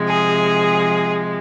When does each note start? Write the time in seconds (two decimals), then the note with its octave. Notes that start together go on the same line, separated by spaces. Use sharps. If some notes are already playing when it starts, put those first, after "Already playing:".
Already playing: C3 F3 G#3
0.08 G#4